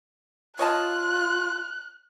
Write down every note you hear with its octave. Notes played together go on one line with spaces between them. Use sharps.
F4 C#5 D#5 A5 F#6